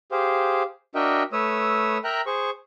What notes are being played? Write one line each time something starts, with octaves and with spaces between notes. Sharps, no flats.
G4 G#4 C5 F5
D4 F#4 A#4 D#5 E5 G5
A3 B4 C#5 D#6 E6
A#4 E5 G5 A#5 F#6
G#4 C5 C#6